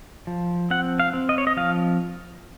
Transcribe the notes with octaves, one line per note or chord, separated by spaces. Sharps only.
F3
C4 F#5
F5
C4
D#5
C#5
D#5
F3 F5